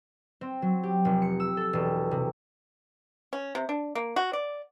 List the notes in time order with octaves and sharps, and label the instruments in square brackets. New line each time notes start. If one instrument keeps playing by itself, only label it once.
[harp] C4
F#3
G4
F1
C#7
E6
A4
E1
C3
[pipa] C#4
C3
D4
A#3
F#4
D5